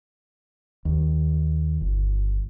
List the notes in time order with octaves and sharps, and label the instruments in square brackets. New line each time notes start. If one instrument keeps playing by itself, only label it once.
[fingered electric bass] D#2
G1